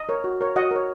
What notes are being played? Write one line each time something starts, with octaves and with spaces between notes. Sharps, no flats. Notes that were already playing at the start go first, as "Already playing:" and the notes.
Already playing: D#5
A#4 C#5
F#4
A#4 C#5
F#4 D#5 F#5
A#4 C#5